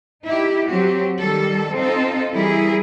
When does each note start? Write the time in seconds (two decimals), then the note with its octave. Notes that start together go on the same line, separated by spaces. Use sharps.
0.24 D#4 E4 G4
0.69 F#3 C4 F#4 G4
1.21 D#3 G3 A4
1.76 C4 D#4 F4 A4
2.32 E3 G3 E4 G#4 A#4